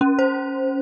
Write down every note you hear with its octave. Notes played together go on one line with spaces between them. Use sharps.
C#4
C5